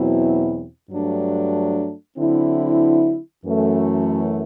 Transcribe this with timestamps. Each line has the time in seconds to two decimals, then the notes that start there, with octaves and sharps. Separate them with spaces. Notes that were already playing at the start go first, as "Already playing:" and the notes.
Already playing: E2 B2 F#3 C4 E4
0.91 G2 F#3 A3 D4
2.18 D3 F#3 C4 E4
3.44 F#2 E3 A3